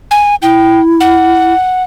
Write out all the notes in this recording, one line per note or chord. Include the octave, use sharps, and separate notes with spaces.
G#5
E4 G5
F#5